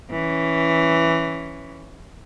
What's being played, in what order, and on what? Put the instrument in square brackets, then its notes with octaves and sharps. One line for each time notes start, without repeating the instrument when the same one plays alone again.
[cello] E3 C#4